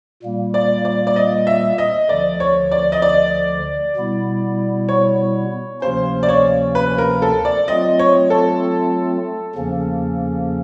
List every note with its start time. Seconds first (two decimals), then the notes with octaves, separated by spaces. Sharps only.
0.23 A#2 G3 A#3
0.54 D5
0.85 D5
1.07 D5
1.16 D#5
1.47 E5
1.78 D#5
2.09 D2 D3 F3 D5
2.40 C#5
2.71 D5
2.92 D#5
3.02 D5
3.96 B2 G3 B3 E4
4.89 C#5
5.82 D2 C3 F3 A#3 C#4 C5
6.23 D5
6.29 C#5
6.75 B4
6.98 A#4
7.22 A4
7.45 D5
7.68 F#3 A3 C4 F4 D#5
7.99 C#5
8.30 A4
9.55 E2 C#3 F3 A#3 C#4